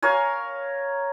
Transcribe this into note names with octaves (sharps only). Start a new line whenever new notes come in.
A#4 C#5 F5 G#5